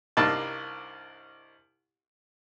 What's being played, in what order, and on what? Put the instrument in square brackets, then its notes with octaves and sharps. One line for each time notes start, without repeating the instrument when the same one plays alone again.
[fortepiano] C2 G2 A#3 D#4 A5